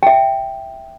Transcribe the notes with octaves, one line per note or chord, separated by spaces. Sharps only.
E5 G5